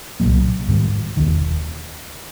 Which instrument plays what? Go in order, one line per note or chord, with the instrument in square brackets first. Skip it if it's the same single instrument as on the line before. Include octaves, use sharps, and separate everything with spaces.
[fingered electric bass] C2 A#2 F#3 A#3
G#2 D#3 G3
E1 D#2 D#3